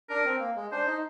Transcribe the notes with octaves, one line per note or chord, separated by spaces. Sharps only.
D4 A#4
C4
A#3
G#3
D4 C5
D#4